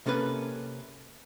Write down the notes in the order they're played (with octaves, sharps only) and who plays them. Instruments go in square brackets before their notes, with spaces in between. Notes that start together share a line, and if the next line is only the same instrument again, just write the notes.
[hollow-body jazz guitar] C3 A#3 C#4 A4 B4